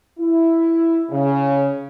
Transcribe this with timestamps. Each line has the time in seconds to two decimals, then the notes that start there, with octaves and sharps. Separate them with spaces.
0.19 E4
1.10 C#3